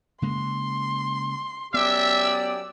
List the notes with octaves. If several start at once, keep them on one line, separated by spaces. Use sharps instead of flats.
C#3 G#3 A#3 C6
F#2 B3 G4 D5 E5 E6